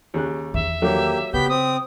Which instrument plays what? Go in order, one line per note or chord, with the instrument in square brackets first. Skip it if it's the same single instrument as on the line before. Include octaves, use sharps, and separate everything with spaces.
[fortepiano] D#2 C#3 F#6
[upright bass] E2 D#3 [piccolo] E5
[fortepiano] D3 F3 F#3 [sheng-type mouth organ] A#3 G4
[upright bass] C#3 [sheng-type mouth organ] B3 G4 G6 [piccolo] B6
[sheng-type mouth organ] C4 [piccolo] D#6